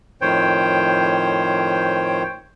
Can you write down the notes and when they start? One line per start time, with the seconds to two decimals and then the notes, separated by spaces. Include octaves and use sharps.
0.21 F2 A2 D#3 C5 C#5 G5